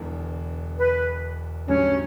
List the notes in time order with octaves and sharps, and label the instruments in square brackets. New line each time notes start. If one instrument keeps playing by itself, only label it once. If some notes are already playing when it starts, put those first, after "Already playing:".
Already playing: [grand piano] E1 E2 D3
[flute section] B4
[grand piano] A1 G2 D3 F#3 A3 [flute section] C#4